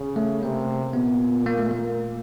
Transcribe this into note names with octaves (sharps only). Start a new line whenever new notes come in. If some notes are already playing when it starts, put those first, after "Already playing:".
Already playing: C#3
A3
C3 A#3
A#2 B3
A#3
A3
A#3